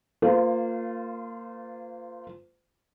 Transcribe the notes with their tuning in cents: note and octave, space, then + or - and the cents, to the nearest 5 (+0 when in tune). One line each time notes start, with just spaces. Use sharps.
A#3 -25 F4 +0 C5 -35